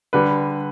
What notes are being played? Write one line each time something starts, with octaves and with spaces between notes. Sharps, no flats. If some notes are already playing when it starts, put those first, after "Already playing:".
D3 G3 B4